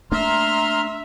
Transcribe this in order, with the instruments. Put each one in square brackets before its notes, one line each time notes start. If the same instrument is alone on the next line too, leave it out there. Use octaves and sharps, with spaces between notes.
[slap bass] A3 A#3 D4 [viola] E5 [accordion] A#5 C6 F6